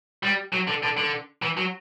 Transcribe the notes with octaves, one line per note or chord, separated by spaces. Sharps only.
G3
F#3
D3
D3
D3
E3
F#3